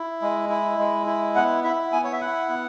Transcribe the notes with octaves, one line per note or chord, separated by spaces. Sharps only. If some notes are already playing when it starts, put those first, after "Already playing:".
Already playing: E4
G#3
E4
G#3
E4
B3 F#5
E4 E5
B3 G#5
C#5
E5
E4 F#5
B3